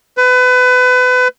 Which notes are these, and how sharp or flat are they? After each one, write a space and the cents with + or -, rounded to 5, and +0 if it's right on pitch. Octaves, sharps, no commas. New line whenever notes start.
B4 +30